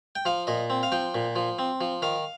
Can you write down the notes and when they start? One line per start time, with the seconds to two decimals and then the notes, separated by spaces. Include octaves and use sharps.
0.16 G5
0.25 F3 F5
0.47 A#2 D#5
0.70 C4
0.83 F5
0.92 F3 G5
1.14 A#2
1.36 F3
1.59 C4
1.81 F3
2.02 D#3 F5